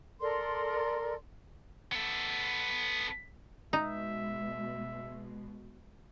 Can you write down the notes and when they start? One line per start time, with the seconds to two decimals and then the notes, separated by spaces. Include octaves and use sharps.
0.20 A4 A#4 D5 C6
1.92 B3 A4
3.73 B2 G#3 D#4 E5